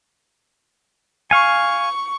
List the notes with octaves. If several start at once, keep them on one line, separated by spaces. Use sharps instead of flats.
F5 G#5 C#6